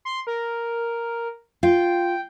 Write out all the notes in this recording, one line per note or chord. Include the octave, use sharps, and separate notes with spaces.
C6
A#4
F4 G5